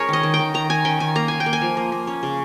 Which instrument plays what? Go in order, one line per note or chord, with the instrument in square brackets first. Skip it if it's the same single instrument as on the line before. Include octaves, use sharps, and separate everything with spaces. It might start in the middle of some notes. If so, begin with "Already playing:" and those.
Already playing: [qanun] G#3 C#4 G#4 A#4 C#5
D#3 D#5
D#3
G5
D#3
D#3 A#5
D#3 G#5
C#4 G5
D#3 G#5
A#3 A#5
A#3 G#5
G5
A#3
G#5
F3
A#3
A#3
C#4
C#3